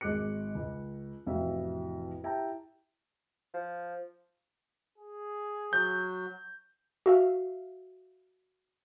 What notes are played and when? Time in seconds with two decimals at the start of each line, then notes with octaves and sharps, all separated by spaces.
0.01 G#1 G#3 D6 F#6 C#7
0.55 C#2
1.26 A1 F2 C3 F#4 E5 F5
2.23 E4 G4 E5 G5 A5 A#5
3.54 F3
4.98 G#4
5.73 F#3 G6
7.06 F#4 E5 F5